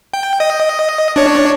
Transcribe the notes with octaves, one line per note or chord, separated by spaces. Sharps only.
G5
D#5
D4 C#5